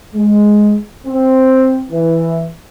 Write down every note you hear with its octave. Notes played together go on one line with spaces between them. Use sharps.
G#3
C4
E3